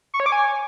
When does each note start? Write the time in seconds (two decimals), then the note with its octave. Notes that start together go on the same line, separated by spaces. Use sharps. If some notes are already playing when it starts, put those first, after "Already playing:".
0.14 C#6
0.20 C#5
0.26 D6
0.32 G#5